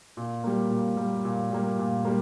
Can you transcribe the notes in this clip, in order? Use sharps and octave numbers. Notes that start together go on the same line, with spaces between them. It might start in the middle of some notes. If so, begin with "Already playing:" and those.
A#2
G3 A#3
A#2
G3 A#3
A#2
G3 A#3
A#2
G3 A#3